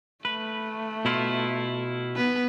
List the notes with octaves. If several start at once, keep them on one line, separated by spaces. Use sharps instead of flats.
A3 B4
B2 E4 F4
B3 B4